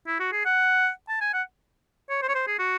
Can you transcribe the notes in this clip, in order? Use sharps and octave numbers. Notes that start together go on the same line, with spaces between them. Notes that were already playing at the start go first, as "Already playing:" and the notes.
E4
F#4
G#4
F#5
A5
G#5
F#5
C#5
C5
C#5
C5
G#4
F#4